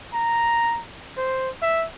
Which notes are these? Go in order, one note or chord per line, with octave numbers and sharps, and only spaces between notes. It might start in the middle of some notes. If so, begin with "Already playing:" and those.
A#5
C5
E5